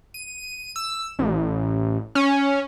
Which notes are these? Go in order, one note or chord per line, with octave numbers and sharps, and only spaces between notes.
D#7
E6
A1
C#4